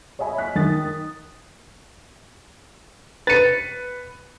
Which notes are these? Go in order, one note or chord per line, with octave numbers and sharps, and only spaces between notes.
C#5 D#5 E5 G#5 B5
F#6 B6
D#3 D#6 A6
B4 A6 C#7 D#7